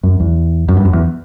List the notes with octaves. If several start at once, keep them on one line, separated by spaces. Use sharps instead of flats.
F#2
E2
F#2
G2
F#2
E2